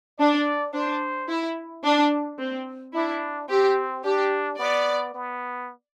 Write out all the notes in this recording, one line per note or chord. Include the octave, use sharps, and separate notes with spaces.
D4 D5
D4 C5
E4
D4
C4
D4 E4
C4 G4
D4 G4
B3 D5
B3